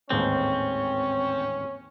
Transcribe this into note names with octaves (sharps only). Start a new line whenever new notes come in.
A1 D#2 G#2 C4 C#4